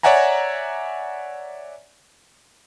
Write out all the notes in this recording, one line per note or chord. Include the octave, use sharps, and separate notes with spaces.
C#5 D5 E5 F#5 G#5 A#5